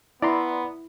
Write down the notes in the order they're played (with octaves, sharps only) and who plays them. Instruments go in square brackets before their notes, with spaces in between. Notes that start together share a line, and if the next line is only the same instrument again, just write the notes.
[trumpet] B3 [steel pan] E4 [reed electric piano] D5 A#5 C6